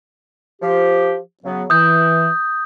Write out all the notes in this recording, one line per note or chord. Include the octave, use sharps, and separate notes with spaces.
F3 G4
C#3 F#3 B3
E3 D#6 G6